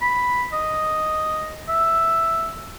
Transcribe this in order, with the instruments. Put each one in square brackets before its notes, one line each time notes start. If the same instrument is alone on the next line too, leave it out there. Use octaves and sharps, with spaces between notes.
[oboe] B5
D#5
E5